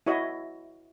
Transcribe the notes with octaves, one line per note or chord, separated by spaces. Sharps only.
E4 F#4 C#5 D#5 E5